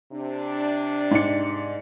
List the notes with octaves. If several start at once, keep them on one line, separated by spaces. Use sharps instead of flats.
C3 D4
G#2 D5 C#7